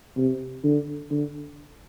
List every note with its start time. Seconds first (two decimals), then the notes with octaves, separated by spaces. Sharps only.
0.17 C3
0.64 D3
1.10 D3